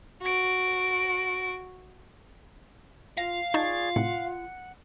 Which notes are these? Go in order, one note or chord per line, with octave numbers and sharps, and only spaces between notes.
F#4 D7
F4 F5 A#6
D#4 F4 G#4 D5 A5 C#6
A2 C3 F#5